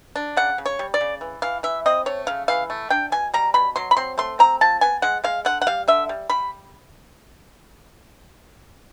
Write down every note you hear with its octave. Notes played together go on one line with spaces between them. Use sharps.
D4
C#3 F#5
C#3
C#5
G3
D5
C#3
E3
E3 F5
E3 E5
C4 D#5
A3 C#5
C#3 F5
E3 F5
A3
D4 G5
B2 G#5
G3 A#5
B2 B5
F#3 C6
B5
C4 C6
A3 C6
C4 A#5
F3 A5
B3 G#5
G#3 F#5
G#3 F5
D3 F#5
F#5
G3 F5
D3 E5
G3
G3 B5